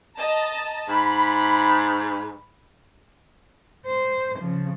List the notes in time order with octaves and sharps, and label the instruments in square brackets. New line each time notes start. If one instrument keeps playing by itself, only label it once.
[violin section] D#5 A5 A#5
[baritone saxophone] G#2 [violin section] B5
[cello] C5
C#3 F3